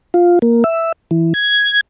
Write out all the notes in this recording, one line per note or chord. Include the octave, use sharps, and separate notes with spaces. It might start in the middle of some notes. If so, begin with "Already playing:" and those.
F4
A#3
E5
E3
G#6